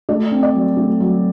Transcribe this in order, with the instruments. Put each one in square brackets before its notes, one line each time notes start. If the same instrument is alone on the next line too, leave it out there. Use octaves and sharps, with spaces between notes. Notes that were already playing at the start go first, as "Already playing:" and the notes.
[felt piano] A3 D5
C4
D5
F#3
A3
F#3